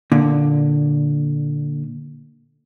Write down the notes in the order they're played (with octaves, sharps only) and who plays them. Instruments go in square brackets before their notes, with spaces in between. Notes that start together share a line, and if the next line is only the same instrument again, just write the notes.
[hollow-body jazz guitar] A#2 D3